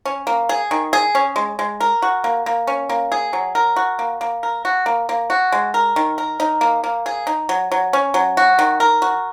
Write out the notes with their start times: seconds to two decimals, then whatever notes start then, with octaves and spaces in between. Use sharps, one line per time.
0.05 C#4
0.27 A#3
0.49 G#4
0.71 D#3
0.93 G#4
1.15 C#4
1.36 G#3
1.59 G#3
1.80 A#4
2.02 F#4
2.24 A#3
2.46 A#3
2.67 C#4
2.89 A#3
3.12 G#4
3.33 F#3
3.55 A#4
3.76 F#4
3.99 A#3
4.21 A#3
4.43 A#4
4.65 F#4
4.86 A#3
5.09 A#3
5.30 F#4
5.52 G#3
5.74 A#4
5.96 D#3
6.18 A#4
6.40 D#4
6.61 A#3
6.84 A#3
7.06 G#4
7.27 D#4
7.49 F#3
7.72 F#3
7.93 C#4
8.14 F#3
8.37 F#4
8.59 D#3
8.80 A#4
9.02 F#4